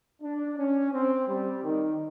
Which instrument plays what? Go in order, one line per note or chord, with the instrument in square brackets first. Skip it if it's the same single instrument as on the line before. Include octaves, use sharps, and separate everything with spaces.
[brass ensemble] D4
C#4
C4
G3
D#3